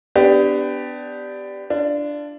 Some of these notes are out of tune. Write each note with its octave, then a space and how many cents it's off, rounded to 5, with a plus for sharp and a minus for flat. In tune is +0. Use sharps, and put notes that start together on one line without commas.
B3 +25 D4 +0 G4 +0
D4 +0 F4 -35